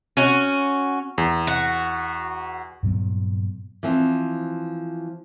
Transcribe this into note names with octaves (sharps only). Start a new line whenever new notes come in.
C#4 F#4
E2
F#4
G2 A#2 F#3 B3
E3 F3 C4